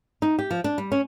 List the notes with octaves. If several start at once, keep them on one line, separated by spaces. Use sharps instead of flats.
D#4
G4
F3
D4
G3
C#4